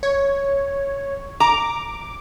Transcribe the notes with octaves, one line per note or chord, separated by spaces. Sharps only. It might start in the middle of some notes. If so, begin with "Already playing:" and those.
C#5
A#5 D6